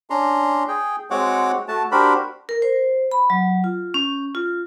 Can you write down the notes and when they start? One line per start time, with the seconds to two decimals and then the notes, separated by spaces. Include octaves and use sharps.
0.10 C#4 D4 A#5 C6
0.68 G#4 G5
1.11 G#3 C4 F#4 C#5 F#5 D6
1.68 A3 F#4 A5
1.92 D4 F#4 G4 A#4 C5 B5
2.49 A#4
2.62 C5
3.11 B5
3.30 F#3
3.64 F4
3.94 C#4
4.35 F4